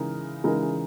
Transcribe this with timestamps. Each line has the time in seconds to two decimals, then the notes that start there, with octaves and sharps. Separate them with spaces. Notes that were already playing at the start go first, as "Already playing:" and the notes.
Already playing: C#3 E3 G#3 D#4 A#4
0.44 C#3 E3 G#3 D#4 A#4